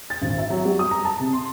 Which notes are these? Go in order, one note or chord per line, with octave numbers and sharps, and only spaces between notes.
A6
G#1
E5
F#3
G3
D#6
A#5
A5
C3
C6